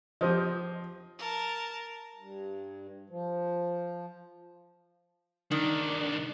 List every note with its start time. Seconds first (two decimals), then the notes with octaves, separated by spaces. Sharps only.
0.21 F3 G4 C5 D#5
1.19 A#4 A5
2.16 G2
3.10 F3
5.51 C2 D#3 D4